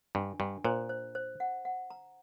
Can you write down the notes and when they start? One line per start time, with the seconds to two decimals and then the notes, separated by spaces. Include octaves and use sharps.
0.15 G2 D4
0.40 G2 D4
0.65 A#2 C5
0.89 C5
1.15 C5
1.40 F#5
1.65 F#5
1.90 A#5